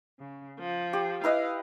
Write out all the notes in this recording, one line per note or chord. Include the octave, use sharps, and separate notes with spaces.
C#3
F3
G4
E4 B4 D#5 F5